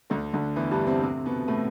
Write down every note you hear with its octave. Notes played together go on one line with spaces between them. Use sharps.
D2 D3
D2 D3
E2 E3
G2 G3
C3 C4
C3 C4
B2 B3
A2 A3